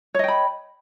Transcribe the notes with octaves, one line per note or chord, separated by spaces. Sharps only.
C#5 D#5 G5 B5